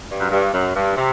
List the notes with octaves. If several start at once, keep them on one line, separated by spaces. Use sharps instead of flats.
G2
F#2
G2
F#2
G2
C3